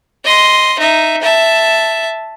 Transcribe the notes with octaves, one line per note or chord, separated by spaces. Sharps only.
D#5 C6
D#4 E5
E5 A5